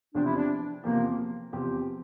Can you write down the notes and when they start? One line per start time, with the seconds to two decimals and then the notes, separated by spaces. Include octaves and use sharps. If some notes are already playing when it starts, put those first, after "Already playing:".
0.15 E2 C3 F3 C4 D4 G4
0.25 E4
0.36 D4
0.84 E2 C3 F3 A#3 C4 G4
1.53 E2 C3 F3 C4 G4